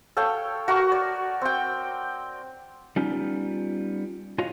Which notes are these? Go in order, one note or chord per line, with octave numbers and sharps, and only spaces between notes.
A4 C#5 F5 G5
F#4 A#4 C#6
D5
C4 G5
G3 B3 C#4 D#4 F4
F4 F#4 G#4 C#5 D#5 F5